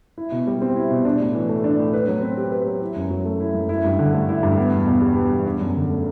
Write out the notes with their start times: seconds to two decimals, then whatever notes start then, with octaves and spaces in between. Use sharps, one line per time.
0.18 E4
0.32 B2
0.47 G3
0.62 C4
0.75 E4
0.91 B2
1.05 D4
1.20 A2
1.34 E3
1.49 A3
1.64 D4
1.79 A2
1.93 B4
2.08 F#3
2.22 C4
2.37 G4
2.52 B4
2.66 F#3
2.81 E4
2.96 F#2
3.10 F#3
3.25 A3
3.40 E4
3.55 F#2
3.69 E4
3.84 G2
3.99 D3
4.14 A3
4.29 E4
4.43 G2
4.58 B3
4.72 E2
4.87 B2
5.02 G3
5.16 B3
5.31 E2
5.46 D4
5.61 F#2
5.75 D3
5.90 A3